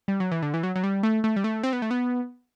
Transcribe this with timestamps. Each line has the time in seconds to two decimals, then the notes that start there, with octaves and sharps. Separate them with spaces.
0.08 G3
0.20 F#3
0.32 E3
0.42 D3
0.54 E3
0.63 F#3
0.76 F#3
0.84 G3
1.03 A3
1.24 A3
1.36 G3
1.44 A3
1.63 C4
1.73 B3
1.82 A3
1.91 B3